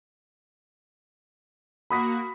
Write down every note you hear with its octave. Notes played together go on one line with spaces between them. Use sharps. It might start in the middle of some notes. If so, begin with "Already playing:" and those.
A#3 F#4 B5 D#6 B6